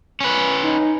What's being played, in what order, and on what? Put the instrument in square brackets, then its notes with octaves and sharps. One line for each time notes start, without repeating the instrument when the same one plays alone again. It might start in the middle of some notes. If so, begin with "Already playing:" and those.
[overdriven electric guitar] C#4 B4
[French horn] D#4